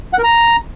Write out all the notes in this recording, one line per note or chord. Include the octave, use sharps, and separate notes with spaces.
F#5
A#4
A#5